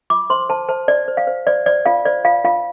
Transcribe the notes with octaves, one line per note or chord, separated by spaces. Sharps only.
F4 D6
C5 C6
C5 A5
C5 A5
C5 D5
C5
F5
C5
C5 D5
C5 D5
F4 F5
C5 D5
F4 F5
F4 F5